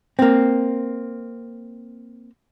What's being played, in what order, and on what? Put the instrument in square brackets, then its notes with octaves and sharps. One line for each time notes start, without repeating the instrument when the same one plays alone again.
[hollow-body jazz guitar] A#3 C4